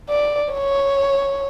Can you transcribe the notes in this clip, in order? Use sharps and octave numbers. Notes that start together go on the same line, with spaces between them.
D5
C#5